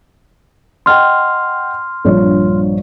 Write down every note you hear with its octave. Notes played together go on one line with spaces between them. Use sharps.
D#5 F#5 G5 C6 F6
A#1 G2 C#5